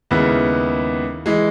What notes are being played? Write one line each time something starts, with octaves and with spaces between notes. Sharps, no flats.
D#2 C#3 G#3 B3 E4
E3 G#3